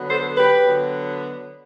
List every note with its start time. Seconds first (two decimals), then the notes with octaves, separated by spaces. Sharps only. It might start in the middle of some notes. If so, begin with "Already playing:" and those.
Already playing: D3 F#3 B3
0.09 A4 C5
0.37 G4 B4
0.66 D3 F#3 B3